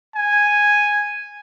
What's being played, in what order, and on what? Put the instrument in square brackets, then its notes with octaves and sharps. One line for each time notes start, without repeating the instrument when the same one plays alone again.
[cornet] G#5